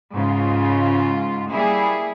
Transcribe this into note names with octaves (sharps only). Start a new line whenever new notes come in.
G#2 C#3 F4
G3 A#3 E4 G#4